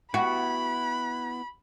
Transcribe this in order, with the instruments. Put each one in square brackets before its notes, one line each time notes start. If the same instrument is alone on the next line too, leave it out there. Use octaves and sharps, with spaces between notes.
[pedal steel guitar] B3 E4 [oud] F#4 [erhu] B5